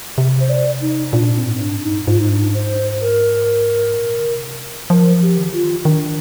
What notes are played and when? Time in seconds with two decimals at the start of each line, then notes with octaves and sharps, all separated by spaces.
0.18 C3
0.40 C5
0.50 D5
0.81 D#4
1.12 A#2 D4
1.36 C4
1.43 G#2
1.60 D4
1.76 G2
1.83 D#4
2.07 G#2 F4
2.19 D#4
2.30 D4
2.42 D#4
2.54 C5
3.01 A#4
3.96 A#2
4.19 D3
4.27 C3
4.90 F3 A#4
5.22 G4
5.38 D#3
5.51 F3 F4
5.63 D#3
5.84 D#3 D4